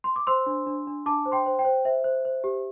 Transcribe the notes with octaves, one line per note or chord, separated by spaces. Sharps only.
C6
D6
C5 C6 E6
D4
D4
D4
D4 A5 D6
C5
G5 C6
C5
G5
C5
C5 E5
C5
C5
G4